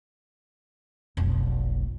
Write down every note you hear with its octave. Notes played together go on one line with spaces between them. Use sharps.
F1 B1